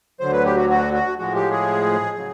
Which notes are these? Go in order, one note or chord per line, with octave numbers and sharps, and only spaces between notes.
D2 D3 F#3 C5
B4
G4
F#4
F#4
F#4
A2 F3 G#3 F#4
G4
G#4
C#3 F#3